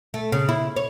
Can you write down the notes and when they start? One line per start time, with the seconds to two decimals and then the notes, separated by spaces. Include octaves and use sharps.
0.14 A3
0.32 C#3
0.49 E4
0.76 C#5